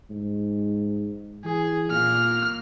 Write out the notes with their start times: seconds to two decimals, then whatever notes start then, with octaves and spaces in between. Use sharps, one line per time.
0.10 G#2
1.45 E3 G#4
1.91 A#2 A#3 F6